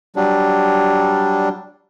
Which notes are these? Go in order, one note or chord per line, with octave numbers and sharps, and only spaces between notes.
F#3 G3 D4